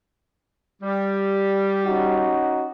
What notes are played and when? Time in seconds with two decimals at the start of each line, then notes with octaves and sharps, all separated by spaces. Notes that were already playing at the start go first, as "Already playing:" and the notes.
0.81 G3
1.85 C#4 D#4 F#4